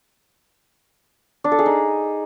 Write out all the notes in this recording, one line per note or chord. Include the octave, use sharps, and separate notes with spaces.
D4
A4
G#4
D#4